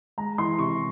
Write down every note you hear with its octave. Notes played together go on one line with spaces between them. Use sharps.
G#3 A#5
E3 C6
C3 C#6